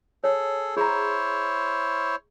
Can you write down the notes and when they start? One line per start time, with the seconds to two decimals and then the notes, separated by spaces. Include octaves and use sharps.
0.24 G#4 A4 C#5
0.77 E4 G#4 C5 C#5 A#5